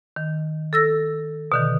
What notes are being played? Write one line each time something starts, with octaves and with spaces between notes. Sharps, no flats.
D#3
A4 E6 A#6
B2 D3 D#3